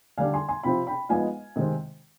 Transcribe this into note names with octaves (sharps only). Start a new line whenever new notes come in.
D3 G3 D4 F5 G#5
G#5 C6
G#5 C6
C3 F3 C4 G5 B5
G5 B5
F3 G#3 B3 D#4 F5 G#5
C3 D#3 G#3 C4